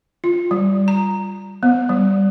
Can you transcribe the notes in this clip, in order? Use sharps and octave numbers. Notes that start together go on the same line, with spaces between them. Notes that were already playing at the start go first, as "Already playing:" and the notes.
F4
G3
A#5
B3
G3